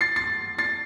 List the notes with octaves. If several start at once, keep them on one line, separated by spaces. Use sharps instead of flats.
A6 C7
A6 C7
A6 C7